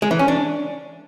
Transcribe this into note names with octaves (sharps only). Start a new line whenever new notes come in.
G#3
E3
C#4
D4